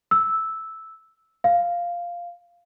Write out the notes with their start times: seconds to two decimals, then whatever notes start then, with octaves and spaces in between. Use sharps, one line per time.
0.11 E6
1.44 F5